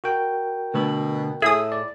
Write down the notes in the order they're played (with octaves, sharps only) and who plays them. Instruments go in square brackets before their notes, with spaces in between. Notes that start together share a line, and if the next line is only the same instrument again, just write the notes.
[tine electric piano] F#4 A#4 G5
[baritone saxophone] B2 [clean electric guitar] D3 A3 B4
[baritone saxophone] A2 [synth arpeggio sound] G#4 D#6 [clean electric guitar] E5
[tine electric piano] D5